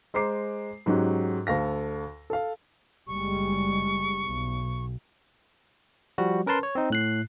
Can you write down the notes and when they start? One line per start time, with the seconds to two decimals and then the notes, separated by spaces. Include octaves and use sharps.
0.14 G#3 C5 A#5 D6 C7
0.86 G#2 F#3 C#4 G4
1.47 D2 A4 F5 A#6
2.30 A4 F5
3.07 F#1 G3 G#3 C#6
4.24 B1
6.18 F3 G3 F#4
6.46 C#4 A#4 B4 A5 C6
6.63 C#5
6.75 C4 D#4
6.90 A2 F#6 C7